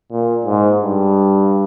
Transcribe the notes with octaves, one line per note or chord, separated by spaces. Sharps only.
A#2
G#2
G2